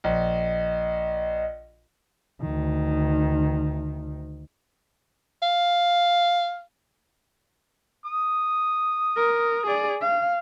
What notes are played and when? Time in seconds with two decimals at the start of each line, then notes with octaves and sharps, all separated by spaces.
0.04 A#1 D#5
2.42 D2 D#3
5.42 F5
8.06 D#6
9.16 A#4
9.67 G#4 D5
10.02 F5